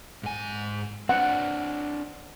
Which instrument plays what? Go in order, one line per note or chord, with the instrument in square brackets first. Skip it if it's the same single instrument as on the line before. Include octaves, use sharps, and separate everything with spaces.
[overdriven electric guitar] G#2 G#5
[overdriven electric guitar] C4 D4 [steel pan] F#5